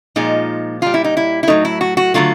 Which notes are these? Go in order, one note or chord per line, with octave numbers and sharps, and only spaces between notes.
A#2 F3 G#3 D#4
A#2 G3 F4
E4
D#4
E4
E4
A2 F#3 A3 D#4
E4
F#4
F#4
D3 F#3 A3 F4